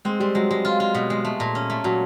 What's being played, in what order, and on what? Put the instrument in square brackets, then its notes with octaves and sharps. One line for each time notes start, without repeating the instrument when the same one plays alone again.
[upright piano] G#3 [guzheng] C4
[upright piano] G3 [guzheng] C4
[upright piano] F#3 [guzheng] G#3
[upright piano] G3 [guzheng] G#3
[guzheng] F4
F4
B2
G#3
A3
A#2
C#4
A3
[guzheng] A#2 [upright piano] F#3